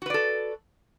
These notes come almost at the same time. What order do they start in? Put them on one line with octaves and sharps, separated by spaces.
F#4 B4 D5 A4